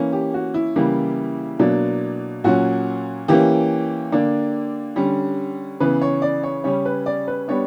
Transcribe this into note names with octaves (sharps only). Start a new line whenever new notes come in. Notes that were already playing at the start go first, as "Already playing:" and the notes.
Already playing: E3 A#3 C#4
G4
F#4
E4
C#3 E3 G3 A#3
B2 F#3 A#3 D4
A#2 F#3 C#4 F#4
E3 A#3 C#4 G4
D3 A#3 D4
D3 G3 C#4
C#3 E3 B3 B4
C#5
D5
C#5
C#3 G3 C#4 C#5
B4
D5
B4
G3 B3 D4 C#5